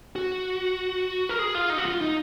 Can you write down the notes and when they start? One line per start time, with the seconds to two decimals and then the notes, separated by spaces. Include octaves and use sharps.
0.16 F#4
1.29 A#4
1.39 G#4
1.55 F4
1.70 D#4
1.78 F#4
1.85 F4
2.01 D#4